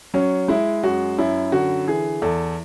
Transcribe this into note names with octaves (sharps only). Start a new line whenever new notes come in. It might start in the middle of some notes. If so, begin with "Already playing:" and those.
F#3 C#4
G#3 E4
F#2 F#4
F#2 E4
D3 F#4
E3 G#4
E2 A4